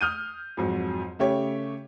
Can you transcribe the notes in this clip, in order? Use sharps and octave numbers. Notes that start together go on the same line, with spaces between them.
D#6 F6 G6 D#7
F2 G#2 F#3
C#3 A3 G4 C#5